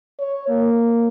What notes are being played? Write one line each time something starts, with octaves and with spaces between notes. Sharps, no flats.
C#5
A#3